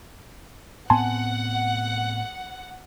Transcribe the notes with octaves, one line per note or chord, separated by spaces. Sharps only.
A2 B3 C4 F#5 G#5 A5 C6